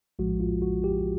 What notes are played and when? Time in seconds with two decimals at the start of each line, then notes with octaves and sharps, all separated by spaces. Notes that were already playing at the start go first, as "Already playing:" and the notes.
0.19 A#1 A2 F3 G#3 F#4
0.40 F4
0.62 F#4
0.84 G4